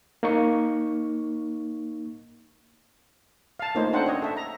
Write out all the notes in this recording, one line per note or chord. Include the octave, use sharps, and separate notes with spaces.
A#3 D#4 C#6
F5 A5
A3 A#3 D#4 F4 C5 C#5
C#4 D4 A4 C5 F#5 G5
C#5 D#5
A4 E5
A#5